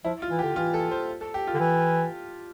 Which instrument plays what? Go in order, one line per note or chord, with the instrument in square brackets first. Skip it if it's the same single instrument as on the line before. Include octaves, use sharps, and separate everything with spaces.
[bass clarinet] F3 [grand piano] E4
[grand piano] F4
[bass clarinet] E3
[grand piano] G4
[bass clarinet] D3
[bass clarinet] E3 [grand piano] F4
[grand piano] A4
C5
A4
G4
F4
[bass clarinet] D3
E3